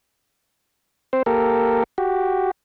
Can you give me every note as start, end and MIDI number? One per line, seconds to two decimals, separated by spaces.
1.13 1.23 60
1.13 1.23 72
1.26 1.83 58
1.26 1.83 67
1.26 1.83 69
1.26 1.83 70
1.98 2.51 66
1.98 2.51 67